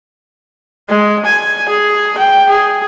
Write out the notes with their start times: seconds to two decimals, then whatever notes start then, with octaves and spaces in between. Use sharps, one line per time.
0.89 G#3
1.25 G#5
1.69 G#4
2.18 G5
2.49 G#4